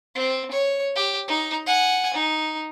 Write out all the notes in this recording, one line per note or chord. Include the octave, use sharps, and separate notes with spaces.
C4
C#5
G4
D#4
F#5 G#5
D#4